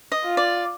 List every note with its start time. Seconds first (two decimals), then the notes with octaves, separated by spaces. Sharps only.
0.12 D#5
0.24 F4
0.37 D5